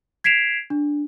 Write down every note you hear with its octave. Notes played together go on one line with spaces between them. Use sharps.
G#6 B6 C7 D7 E7 F7
D4